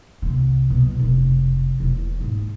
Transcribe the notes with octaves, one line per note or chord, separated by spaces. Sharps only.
C2 D3
B2 F#3
F1
E1
G#2